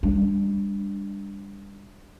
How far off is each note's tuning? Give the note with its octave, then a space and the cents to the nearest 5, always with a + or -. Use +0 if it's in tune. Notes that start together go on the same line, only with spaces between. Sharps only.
G3 +35 D4 +0